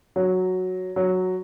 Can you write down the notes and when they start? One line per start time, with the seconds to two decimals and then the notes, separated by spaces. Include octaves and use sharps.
0.16 F#3
0.96 F#3